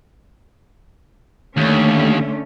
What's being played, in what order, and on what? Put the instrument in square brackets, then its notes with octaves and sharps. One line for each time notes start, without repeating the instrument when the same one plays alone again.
[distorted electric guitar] D#2 [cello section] D3 A3 C#4